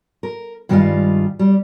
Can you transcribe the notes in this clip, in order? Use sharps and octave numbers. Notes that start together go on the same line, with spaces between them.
A#4
G2 D#3 F3 G3 G#3 F4
G3